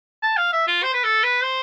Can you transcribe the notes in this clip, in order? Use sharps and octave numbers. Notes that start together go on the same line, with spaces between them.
A5
F5
E5
F4
C5
B4
A4
B4
C5